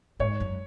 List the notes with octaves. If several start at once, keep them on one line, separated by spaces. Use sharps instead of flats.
G#2 C#5
F#2